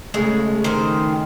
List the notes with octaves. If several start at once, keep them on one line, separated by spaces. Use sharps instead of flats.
C#3 G#3 A3
D#3 C5